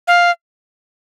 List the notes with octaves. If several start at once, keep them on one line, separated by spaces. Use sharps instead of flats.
F5